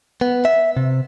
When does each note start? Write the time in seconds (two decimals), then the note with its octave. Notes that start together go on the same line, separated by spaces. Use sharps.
0.21 B3
0.45 E5
0.77 C3